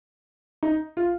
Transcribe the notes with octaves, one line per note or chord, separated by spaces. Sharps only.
D#4
F4